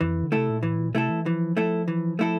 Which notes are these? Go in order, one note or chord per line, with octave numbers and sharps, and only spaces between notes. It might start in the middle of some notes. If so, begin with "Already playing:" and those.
F2 E3
D3
C3 A3 E4 A4
A#2
A2 E3
A#2
C3 A3 E4 A4
E3
E3 F3
A3 E4 A4
E3
A3 E4 A4